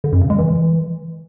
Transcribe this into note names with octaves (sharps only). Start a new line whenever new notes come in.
D3
F#2
C#3
G#3
E3